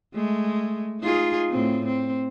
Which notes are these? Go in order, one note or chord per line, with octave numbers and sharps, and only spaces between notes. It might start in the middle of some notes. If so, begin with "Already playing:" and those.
G#3 A3
D#4 F4 G#4
A2 C4
C4